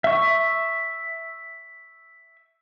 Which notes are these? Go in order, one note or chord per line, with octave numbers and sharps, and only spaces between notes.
E5 C#6